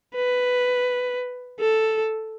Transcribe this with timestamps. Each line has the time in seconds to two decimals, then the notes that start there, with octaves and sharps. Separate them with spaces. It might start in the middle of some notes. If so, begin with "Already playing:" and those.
0.15 B4
1.60 A4